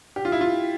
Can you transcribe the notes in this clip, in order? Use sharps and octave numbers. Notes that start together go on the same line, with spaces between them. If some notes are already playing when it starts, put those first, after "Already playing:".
G4
F4
E4
F4